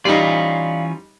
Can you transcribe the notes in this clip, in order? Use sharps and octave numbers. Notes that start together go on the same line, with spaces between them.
E3 G3 C#4 D#4 F4 D5 F5